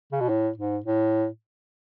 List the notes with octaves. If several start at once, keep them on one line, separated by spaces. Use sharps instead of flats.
C#3
B2
A2
G#2
A2